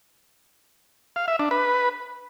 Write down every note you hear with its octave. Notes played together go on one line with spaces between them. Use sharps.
F5
E5
D4
B4